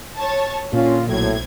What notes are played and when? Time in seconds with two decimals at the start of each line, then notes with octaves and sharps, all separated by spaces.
0.16 C#5 A5
0.73 A#2 D3 C#4 F4
1.08 B1 A2 F#3 C4 G#6